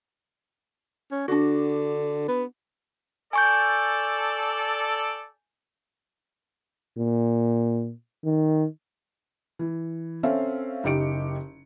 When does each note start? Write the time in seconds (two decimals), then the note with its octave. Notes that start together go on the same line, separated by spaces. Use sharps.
1.11 C#4
1.28 D3 D4 F#4
2.28 B3
3.33 A4 D5 G#5 C#6 G6
6.98 A#2
8.25 D#3
9.59 E3
10.23 C4 C#4 A4 E5 F5
10.84 F#1 D#4 G4 C#7 D7